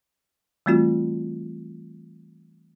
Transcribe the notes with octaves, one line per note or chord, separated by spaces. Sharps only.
E3 G3 A3 C4 F4 F#4